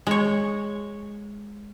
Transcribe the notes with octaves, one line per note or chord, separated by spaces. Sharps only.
G#3 C#5